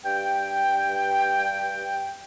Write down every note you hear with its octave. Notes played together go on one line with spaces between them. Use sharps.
G2 G5